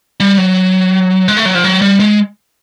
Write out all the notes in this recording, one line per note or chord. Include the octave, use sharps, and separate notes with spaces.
G3
F#3
G#3
A3
F#3
F3
F#3
G3
G#3